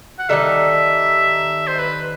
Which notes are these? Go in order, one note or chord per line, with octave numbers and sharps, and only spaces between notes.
F#5
D#3 G3 D#4 A4 E5
C5
B4